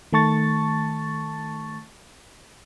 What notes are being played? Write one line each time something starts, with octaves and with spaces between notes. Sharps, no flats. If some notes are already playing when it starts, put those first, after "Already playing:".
D#3 A3 A5 C#6 A6